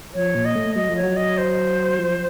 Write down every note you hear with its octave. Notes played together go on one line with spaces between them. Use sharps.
F3 C#5
A#2
D#5
A3
F#3 D#5
F3
C#5
F#3
D#5
C5
F3